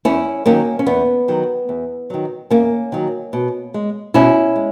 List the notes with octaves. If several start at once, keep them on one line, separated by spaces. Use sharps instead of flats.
E2 C#4 E4
D#3 F#3 A#3 C#4
C#4
E2 B3
D#3 F#3
E2
D#3 F#3
E2 A#3 C#4
D#3 F#3
B2
G#3
B2 C#4 E4
G#3